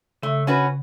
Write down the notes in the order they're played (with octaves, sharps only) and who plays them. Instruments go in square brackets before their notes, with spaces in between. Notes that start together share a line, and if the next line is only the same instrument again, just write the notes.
[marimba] C#3 [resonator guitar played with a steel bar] A3
[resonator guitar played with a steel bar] C#4 F#4 B4